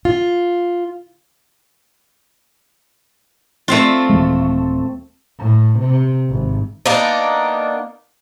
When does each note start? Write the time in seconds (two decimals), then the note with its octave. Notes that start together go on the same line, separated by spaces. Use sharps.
0.05 F4
3.68 A3 C4 F4
4.10 D#1 E3 G#3
5.39 A2
5.79 C3
6.30 G#1
6.86 A#3 B3 D4 D#4